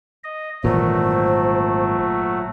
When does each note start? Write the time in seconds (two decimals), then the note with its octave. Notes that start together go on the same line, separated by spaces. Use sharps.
0.24 D#5
0.64 G#1 A#2 E3 F#3 A3 C5